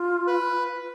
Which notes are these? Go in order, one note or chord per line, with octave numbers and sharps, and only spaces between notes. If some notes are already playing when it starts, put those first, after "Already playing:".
Already playing: F4
B4